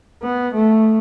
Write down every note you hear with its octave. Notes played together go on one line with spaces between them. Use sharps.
B3
A3